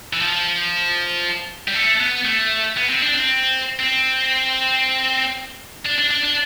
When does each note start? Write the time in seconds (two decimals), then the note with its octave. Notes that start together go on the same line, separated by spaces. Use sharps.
0.13 E3
0.20 F3
1.68 G3
1.74 A3
2.00 B3
2.25 A3
2.77 B3
2.89 C4
3.02 D4
3.15 C4
3.80 C4
5.85 D4
5.98 D4
6.10 D4
6.23 D4